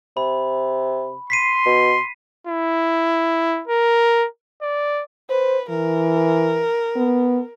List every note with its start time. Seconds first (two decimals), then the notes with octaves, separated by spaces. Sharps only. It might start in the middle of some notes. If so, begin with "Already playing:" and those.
0.17 C3 B5
1.30 C6 B6 C7 D#7
1.66 B2
2.47 E4
3.68 A#4
4.62 D5
5.30 B4 C5
5.69 E3 A#4
6.96 B3